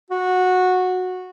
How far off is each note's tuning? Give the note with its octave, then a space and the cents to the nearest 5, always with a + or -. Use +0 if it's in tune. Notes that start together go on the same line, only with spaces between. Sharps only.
F#4 -15